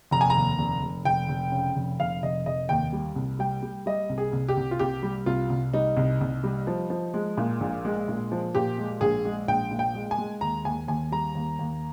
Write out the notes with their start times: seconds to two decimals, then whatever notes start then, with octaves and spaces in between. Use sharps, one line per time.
0.11 F1 A#5
0.21 G#5
0.30 A#5
0.36 D#2
0.59 F1
0.82 F1
1.05 F1 G5
1.28 F1
1.52 C#3
1.76 F1
2.00 F1 F5
2.23 F1 D#5
2.46 F1 D#5
2.69 D#2 G5
2.93 G3
3.16 C2
3.39 G3 G5
3.63 G3
3.86 G3 D#5
4.09 C2
4.18 G#4
4.33 C2
4.49 G4
4.57 C2
4.71 F4
4.79 C2 G4
5.03 G3
5.26 C2 F4
5.50 C2
5.73 G3 D#4
5.97 C2
6.21 C2
6.44 G3
6.67 F3
6.90 F3
7.14 G#3
7.37 A#2
7.60 A#1
7.85 G#3
8.08 A#2
8.32 F3
8.55 A#2 G4
8.78 G#3
9.01 A#1 G#4
9.25 G#3
9.48 A#1 G5
9.71 A#2
9.79 G5
9.95 G#3
10.11 G#5
10.18 G#3
10.41 D#2 A#5
10.65 D#2 G#5
10.88 D#2 G#5
11.12 G3 A#5
11.35 D#2
11.59 D#2